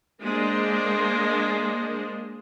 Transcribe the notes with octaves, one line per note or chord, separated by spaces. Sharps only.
G#3 A#3 D4 C5